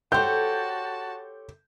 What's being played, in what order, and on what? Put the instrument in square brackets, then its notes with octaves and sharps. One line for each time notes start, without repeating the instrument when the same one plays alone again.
[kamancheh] F#4 A5 [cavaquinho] G4 C5 [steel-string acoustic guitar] A4 C#5 [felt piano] G6